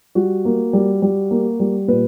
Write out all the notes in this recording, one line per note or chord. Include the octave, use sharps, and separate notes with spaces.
G3 F#4
A#3
G3
G3
A#3
G3
A#2 B4